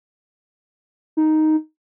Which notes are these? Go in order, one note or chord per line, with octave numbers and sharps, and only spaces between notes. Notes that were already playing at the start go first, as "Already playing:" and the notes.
D#4